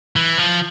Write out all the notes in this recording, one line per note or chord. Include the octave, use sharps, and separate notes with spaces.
E3
F3